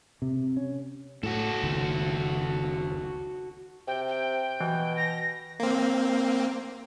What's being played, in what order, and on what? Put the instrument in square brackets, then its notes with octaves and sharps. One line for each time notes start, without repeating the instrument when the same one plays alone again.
[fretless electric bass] C3
C#4
[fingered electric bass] A2 [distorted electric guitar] F#4 A4
[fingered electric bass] F1 C#2 D#3
[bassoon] C3 [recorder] G5
[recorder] G5
[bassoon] B2 [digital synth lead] E3
[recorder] A#6
[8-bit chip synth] A#3 C4